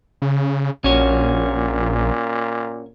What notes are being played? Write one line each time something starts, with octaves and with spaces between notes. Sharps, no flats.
C#3
A#1 A#2 C#4 F#4 C#5